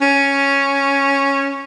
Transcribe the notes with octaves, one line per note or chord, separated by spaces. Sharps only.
C#4